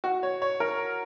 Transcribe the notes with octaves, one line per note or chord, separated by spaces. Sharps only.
F#4
C#5
C#5
A#4